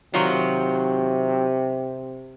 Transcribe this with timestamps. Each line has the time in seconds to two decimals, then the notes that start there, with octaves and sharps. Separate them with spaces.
0.14 C3 D#3 F#3 F4